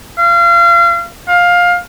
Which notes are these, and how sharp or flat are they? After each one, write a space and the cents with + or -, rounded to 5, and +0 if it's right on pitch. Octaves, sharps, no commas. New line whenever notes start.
F5 -30
F5 +15